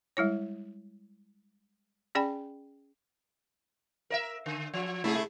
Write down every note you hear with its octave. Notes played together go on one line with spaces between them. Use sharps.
G3 G#3 E4 C#5
C#4 G#4 D5 G5 G#5 B5
A#4 D#5 E5
D3
F3
C3 A3 E4 G#4